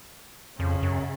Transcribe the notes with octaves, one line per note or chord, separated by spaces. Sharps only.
F2 C#3
F#2